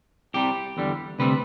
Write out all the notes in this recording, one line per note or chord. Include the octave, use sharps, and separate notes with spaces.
C2 C3 G3 G4
E2 D3 G3
D2 C3 G3 C4 B4